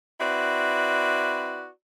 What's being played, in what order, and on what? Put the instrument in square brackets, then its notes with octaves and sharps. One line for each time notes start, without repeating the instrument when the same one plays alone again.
[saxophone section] C4 E4 F#4 B4 D5